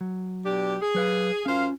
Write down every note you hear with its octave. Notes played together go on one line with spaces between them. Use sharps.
F#3
B2 D4 G4
G#4
F#3 B4 F5
F#2 C#4 F4 C5 F5